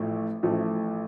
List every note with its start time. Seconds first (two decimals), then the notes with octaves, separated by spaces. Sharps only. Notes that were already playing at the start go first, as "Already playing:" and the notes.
Already playing: A1 A2 F3 A3
0.43 A1 A2 F3 A3